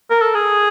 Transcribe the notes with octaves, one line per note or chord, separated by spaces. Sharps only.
A#4
A4
G#4